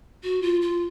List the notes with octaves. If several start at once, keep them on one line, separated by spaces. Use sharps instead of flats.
F#4
F4
F4